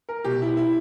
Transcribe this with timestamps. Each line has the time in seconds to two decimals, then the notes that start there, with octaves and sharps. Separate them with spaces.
0.09 A#4
0.24 B2 G4
0.42 E4
0.57 E4